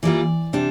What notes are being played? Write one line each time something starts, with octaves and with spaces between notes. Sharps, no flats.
E3 G3 A#3 F4 D5
C3 G3 D4